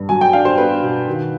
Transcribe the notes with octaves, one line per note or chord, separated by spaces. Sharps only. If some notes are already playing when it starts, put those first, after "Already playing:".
Already playing: G2
F#3 G#5
G5
D4 F5
C5
B3 B4
B2
D#3